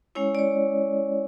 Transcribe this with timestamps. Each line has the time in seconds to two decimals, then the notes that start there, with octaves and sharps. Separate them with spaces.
0.15 G#3 C#4 E4 C#5
0.35 D5
0.39 C#5